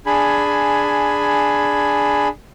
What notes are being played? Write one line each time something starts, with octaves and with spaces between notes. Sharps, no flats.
D4 G#4 G#5 B5